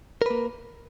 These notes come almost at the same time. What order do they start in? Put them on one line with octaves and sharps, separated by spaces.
A#4 B4 A#3